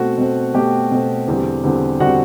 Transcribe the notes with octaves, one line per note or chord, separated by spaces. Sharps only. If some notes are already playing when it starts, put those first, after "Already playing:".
Already playing: B2 A3 C4 F#4 F#5
B2 A3 C4
B2 A3 C4 G4 G5
B2 A3 C4
E2 D3 G3 C4
E2 D3 G3 C4
D3 G3 C4 F#4 F#5